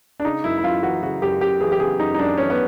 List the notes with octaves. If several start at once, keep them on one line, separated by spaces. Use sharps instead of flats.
D4
C#3 D#4
F#2 E4
E4
F#2 F4
E3 F#4
C#3 F#4
F#2 G4
F#2 G4
E3 G#4
G4
C#3 G#4
F#2 D#4
D#4
F#2 D4
E3 C#4
B3